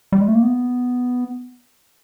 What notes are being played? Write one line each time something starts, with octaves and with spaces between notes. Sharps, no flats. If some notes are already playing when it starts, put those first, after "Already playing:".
G3
G#3
A3
A#3
B3